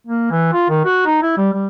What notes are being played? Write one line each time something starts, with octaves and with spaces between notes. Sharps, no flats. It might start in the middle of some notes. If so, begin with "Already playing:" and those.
A#3
E3
F4
D#3
F#4
D#4
E4
G3
G3